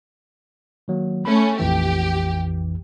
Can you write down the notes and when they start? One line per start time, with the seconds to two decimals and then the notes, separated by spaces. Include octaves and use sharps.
0.88 D#3 F#3 A#3
1.25 A3 C#4 B5
1.59 A#1 F2 E3 G4